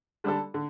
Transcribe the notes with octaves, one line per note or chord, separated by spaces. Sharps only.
D3 G3 D4 A4
D3